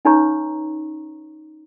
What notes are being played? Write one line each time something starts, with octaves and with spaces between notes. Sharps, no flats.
C#4 D#4 B4 C#5 A#5 C#6